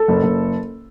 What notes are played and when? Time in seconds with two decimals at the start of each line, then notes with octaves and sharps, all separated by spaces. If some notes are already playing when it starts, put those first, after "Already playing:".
Already playing: A4
0.08 F#1
0.23 F#1